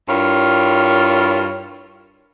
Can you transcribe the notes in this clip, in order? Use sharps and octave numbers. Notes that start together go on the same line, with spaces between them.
G2 E4 F4 A#4 C#5